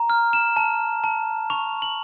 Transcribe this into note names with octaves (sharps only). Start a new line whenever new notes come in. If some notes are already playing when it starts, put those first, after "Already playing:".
Already playing: A#5
F6
E7
A5
A5
C#6 F7
F#7